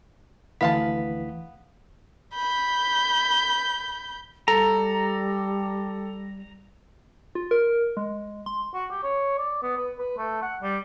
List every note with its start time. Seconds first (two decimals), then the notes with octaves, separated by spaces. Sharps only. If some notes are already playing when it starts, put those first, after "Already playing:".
0.61 D2 E3 B3 F5 A5 B6
2.34 B5 G6
4.48 G3 A4 A#5
7.35 F4
7.51 A#4
7.97 G#3
8.46 C6
8.74 F#4
8.91 G4
9.03 C#5
9.38 D5
9.62 B3
9.78 B4
9.99 B4
10.18 A3
10.42 F#5
10.62 G3